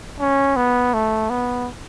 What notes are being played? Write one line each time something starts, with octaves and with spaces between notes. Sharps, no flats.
C#4
B3
A3
B3